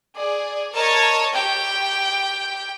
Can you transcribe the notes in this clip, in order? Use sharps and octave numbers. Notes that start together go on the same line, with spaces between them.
G#4 D5
A#4 C#5 D#5 A5
G4 G5